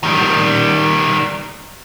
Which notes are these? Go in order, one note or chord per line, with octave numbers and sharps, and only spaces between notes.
D#3 G3